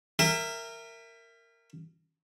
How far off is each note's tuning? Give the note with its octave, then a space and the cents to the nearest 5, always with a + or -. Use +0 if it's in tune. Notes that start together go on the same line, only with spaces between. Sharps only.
A#4 -15 E5 +10 G5 +45